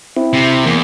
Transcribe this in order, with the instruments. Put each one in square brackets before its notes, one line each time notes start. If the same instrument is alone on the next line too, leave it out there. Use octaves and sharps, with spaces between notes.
[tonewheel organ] C4 E4
[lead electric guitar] C3
[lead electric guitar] E2 [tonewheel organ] A#3